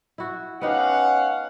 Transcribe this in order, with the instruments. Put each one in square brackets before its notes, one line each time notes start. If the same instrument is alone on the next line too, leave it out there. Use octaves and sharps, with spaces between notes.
[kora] E4 F#4
[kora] B3 D#4 G4 [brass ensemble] C#4 F5 F#5